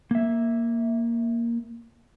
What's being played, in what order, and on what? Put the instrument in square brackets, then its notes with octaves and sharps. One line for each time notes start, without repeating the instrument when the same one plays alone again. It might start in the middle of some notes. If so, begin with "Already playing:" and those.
[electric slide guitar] A#3 E5